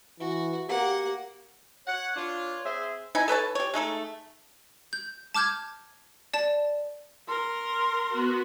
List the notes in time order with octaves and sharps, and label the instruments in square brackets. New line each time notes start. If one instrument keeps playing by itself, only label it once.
[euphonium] E3 [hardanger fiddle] F#4
[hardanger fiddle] A#3 F#5 [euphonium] G4
[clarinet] C#5 [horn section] F#5
[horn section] D4 F4
[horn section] C4 G#4 C5 [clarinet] E5
[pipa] D#4 E4 G#5
A4 B4 C#5 A5
G4 C#5
G#3 A3 D#4 A4
[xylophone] G6
A5 D6 F6 G6 G#6
D5 A5 E7
[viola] A#4 [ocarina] C6
[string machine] B3 F#4